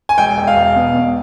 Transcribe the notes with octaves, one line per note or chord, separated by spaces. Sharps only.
G#5
E1 G5
E1
F5
E1
B2
E1